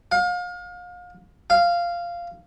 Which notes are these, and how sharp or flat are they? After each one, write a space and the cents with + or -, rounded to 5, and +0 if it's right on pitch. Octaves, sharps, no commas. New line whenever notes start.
F5 +35
F5 -10